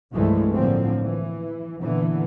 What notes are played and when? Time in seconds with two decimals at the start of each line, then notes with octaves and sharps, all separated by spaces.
0.13 C2 G2 E3 F3 G#3 A3
0.53 A2 D3 F3 F#3 A#3 C4
1.05 E3
1.81 A#2 D3 E3 B3